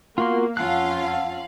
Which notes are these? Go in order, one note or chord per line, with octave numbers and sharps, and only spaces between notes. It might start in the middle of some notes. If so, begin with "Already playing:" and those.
A#3 B3 F4 F#4 A#4 F5 C6
F2 C#4 F4 F5 F#5 A5 E6 F#6